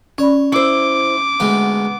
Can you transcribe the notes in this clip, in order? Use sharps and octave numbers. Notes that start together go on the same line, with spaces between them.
C#4 C#5 D5 B5
E4 C5 D6
D2 G#3 A3 B3